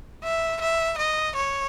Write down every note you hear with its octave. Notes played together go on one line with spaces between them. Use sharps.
E5
E5
D#5
C#5